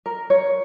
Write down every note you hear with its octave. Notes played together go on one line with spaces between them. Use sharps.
A#4
C#5